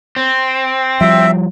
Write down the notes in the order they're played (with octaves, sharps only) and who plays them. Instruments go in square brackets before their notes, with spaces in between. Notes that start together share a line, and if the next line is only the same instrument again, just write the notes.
[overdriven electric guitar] C4
[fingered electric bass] F3 G3 [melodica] E5